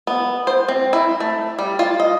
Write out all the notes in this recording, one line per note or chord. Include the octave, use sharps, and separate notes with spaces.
B3
C5
C4
E4
A3
G3
F4
D#5